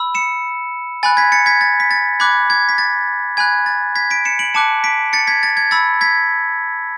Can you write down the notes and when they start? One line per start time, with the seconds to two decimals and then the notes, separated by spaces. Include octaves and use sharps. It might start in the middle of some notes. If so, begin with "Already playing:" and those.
Already playing: B5 E6
0.15 C#7 E7
1.03 G#5 B5 F#6 A6
1.17 G#6 B6
1.32 A6 C#7
1.46 G#6 B6
1.61 A6
1.80 B6
1.91 A6
2.20 B5 D6 F#6 G#6
2.50 G#6
2.69 B6
2.78 A6
3.37 G#5 B5 F#6 G#6
3.66 A6
3.95 G#6 B6
4.10 B6 D7
4.25 C#7 E7
4.39 D7 F#7
4.54 A5 D6 F#6 C#7 E7
4.84 B6 D7
5.13 A6 C#7
5.27 G#6 B6
5.43 A6
5.57 G#6
5.71 B5 E6 A6
6.01 G#6 B6